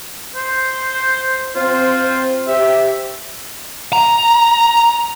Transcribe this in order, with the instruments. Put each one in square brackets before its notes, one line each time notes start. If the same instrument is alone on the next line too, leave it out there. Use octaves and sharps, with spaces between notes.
[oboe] C5
[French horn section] C4 C5 [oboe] F4
[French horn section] G4 C5 [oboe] E5
[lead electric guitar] A#5